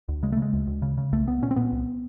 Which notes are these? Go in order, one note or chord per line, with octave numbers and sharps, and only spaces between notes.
D2
C#3 G#3
A3
C#3 G#3
D2
D2
C#3
C#3
C2 A3
C2 B3
A#2 C#4
C4
A#2 B3
C2